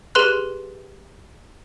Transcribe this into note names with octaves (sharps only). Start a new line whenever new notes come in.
G4 G#4 B4 C6 F#6